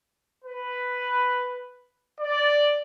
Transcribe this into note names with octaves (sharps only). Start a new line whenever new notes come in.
B4
D5